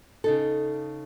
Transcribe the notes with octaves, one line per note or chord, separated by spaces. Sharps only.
C#3 D#4 A4